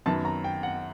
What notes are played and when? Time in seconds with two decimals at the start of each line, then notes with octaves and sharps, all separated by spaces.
0.06 F#2 D#3 F#3 B3 A5
0.25 A#5
0.44 G5
0.63 F#5